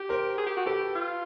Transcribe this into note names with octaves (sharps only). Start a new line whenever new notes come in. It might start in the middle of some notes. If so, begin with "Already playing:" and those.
Already playing: G4
A#4 C5
G#4
G4
F#4
G4 A4 B4
F4